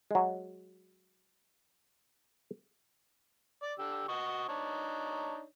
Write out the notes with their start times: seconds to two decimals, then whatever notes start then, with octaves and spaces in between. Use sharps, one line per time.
0.11 F#3 G#3
3.62 D5
3.79 D3 G4 E6
4.08 F#4 D#5 C#6
4.48 D4 D#4 C#5